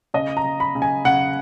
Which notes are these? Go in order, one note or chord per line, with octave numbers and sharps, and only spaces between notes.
C#3 D#5
A#5
C#3
B5
C#3
G#5
C#3 F#5